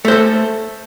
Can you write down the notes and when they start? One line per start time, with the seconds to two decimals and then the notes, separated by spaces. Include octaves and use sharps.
0.05 A3
0.08 C5
0.11 A4